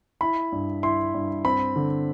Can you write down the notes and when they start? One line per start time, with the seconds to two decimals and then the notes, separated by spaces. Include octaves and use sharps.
0.21 E4 B5
0.52 G2
0.83 E4 C6
1.14 G2
1.45 C4 B5
1.76 D3